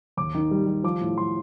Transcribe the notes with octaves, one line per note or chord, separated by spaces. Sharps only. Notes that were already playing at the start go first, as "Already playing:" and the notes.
D#2 D6
D#3
G3
G3
F3 D6
A2
F3 C6